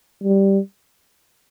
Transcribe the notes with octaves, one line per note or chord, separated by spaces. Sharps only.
G3